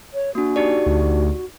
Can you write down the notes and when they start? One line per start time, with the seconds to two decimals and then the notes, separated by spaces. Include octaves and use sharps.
0.14 C#5
0.35 A#3 D4 F#4
0.56 D#4 G4 D5
0.86 D2